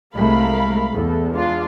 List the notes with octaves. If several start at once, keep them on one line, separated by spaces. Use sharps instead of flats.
C2 G#3 A3 A#4 F5 B5
E2 A4
G#3 D4 F4